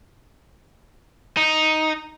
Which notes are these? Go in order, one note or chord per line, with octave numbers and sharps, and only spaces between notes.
D#4